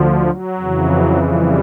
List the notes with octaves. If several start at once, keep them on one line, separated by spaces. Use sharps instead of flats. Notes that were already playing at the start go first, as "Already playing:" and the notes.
Already playing: D2 D3 F3
F#3
F2 C#3 E3
G3